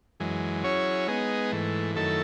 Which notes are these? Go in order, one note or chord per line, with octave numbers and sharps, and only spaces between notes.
F#2 E3 G#3
F#3 C#4 E4 G#4 C#5
G#3 B3 D#4 G#4
G#2 E3 A3
F#2 D#3 A3 E4 A4